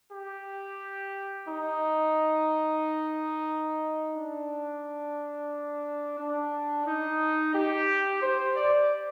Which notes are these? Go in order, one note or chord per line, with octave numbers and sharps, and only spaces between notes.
G4
D#4
D4
D4
D#4
G4
C5
D5